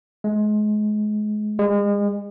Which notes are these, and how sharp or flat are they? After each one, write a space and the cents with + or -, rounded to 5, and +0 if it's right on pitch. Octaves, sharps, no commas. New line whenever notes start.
G#3 +30
G#3 -35